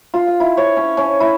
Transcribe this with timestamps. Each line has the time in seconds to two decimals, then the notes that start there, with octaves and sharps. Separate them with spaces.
0.14 F4
0.27 F5
0.40 E4
0.57 C#5
0.77 C#4
0.97 C#4
1.20 E4